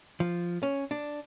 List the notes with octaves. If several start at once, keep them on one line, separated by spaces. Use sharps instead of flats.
F3
C#4
D4